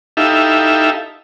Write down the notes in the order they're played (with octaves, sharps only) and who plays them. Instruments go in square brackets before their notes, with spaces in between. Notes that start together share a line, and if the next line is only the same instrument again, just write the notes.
[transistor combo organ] D#4 E4 G4 A4 E5 F5